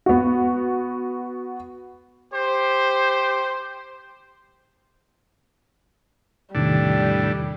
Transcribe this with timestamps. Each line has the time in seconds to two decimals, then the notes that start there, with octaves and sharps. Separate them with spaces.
0.06 B3 F#4
2.33 G4 C5
6.55 E2 A2 C3 D#3 G3 D4